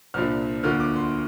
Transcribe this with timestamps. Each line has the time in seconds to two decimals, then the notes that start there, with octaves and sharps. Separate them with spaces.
0.14 C2 A#2 F3 D4 F4 F6
0.63 D2 D3 A#3 F4 F6
0.80 D6
0.96 C6